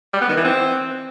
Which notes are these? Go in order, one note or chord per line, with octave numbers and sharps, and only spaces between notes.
G3
B3
D#3
E3
C4